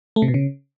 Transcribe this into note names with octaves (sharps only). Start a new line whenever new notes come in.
A3
C3
B2
C#3